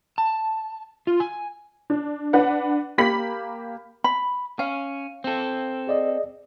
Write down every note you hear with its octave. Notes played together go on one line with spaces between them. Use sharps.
A5
F4
G#5
D4
D4 B4 F#5
A#3 G4 B5 B6 F#7
B5
C#4 F5
C4 A4
G#4 D5 D#5